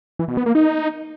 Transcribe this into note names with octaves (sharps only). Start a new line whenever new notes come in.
E3
B2
B3
A#3
D#4